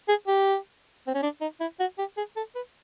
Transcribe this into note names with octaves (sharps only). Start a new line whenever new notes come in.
G#4
G4
C4
C#4
D4
D#4
E4
F#4
G4
G#4
A4
B4